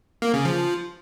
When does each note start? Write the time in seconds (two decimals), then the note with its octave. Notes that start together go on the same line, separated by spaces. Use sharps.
0.22 A#3
0.34 C#3
0.45 F3